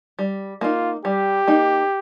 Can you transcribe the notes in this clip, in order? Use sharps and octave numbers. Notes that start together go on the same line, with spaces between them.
G3
A#3 D#4 F4
G3 G4
A#3 D#4